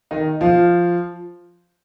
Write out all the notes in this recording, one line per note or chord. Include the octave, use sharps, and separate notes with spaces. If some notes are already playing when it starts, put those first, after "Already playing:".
D#3 D#4
F3 F4